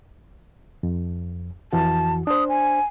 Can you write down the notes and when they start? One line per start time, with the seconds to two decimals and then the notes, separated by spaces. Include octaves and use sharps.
0.83 F2
1.73 F2 E3 F#4 A5
2.27 D4 C5 D#6
2.49 G#5